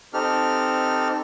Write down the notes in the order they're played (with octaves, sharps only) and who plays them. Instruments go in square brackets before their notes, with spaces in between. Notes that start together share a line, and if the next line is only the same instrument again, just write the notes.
[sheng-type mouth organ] C4 D#4 G4 A4 F6